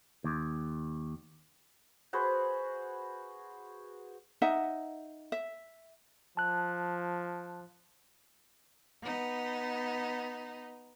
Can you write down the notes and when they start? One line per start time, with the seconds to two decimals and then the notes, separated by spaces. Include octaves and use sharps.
0.24 D#2
2.13 F#4 G#4 B4 C5
4.42 D#4 D#5 E5 F#5
5.32 E5
6.37 F3 A5 F#6
9.02 B3 D#4